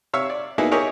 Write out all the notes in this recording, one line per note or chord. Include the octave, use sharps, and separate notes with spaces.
C3 C#5 E5 F5 E6
D5
A#3 B3 D#4 E4 F#4 G#4
E4 G4 G#4 A#4 C#5 D#5